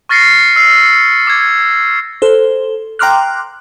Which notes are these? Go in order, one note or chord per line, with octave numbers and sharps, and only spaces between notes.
C#6 F6 A6 A#6 C7 C#7
E6 C7
C#7
D6 G#6
A4 C5
G5 A#5 C6 D6 F6 F#6